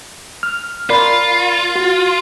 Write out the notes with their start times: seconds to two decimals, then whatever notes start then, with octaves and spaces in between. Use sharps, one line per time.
0.43 F6
0.90 F4 A#4 D5 B5
1.76 F#4